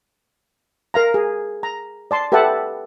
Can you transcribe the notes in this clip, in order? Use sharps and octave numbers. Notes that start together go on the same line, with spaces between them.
A#4 F5 A#5
G#4
A#5
D5 A5 C6
G4 A4 B4 E5 F#5 A5